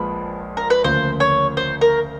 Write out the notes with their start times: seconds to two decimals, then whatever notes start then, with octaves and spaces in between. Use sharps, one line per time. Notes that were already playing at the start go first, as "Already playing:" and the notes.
Already playing: A#1 A#2 F3 G#3 B4
0.57 A#4
0.70 B4
0.84 D2 C#3 F3 A#3 C5
1.20 C#5
1.57 C5
1.81 A#4